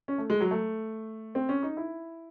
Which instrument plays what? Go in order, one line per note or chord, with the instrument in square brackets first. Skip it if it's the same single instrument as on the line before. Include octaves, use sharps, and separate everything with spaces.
[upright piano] C#4
A3
G#3
F#3
A3
C4
C#4
D#4
E4